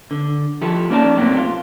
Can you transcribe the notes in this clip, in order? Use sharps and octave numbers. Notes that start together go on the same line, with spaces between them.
D3
F3 E4 G4 A4
A#3 C#4 D#4 E4 D5 A5
A2 C3 F#3 A3 A#3 C4
F4